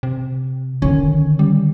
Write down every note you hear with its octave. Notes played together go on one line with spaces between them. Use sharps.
C3
D3 D#3 C#4
G3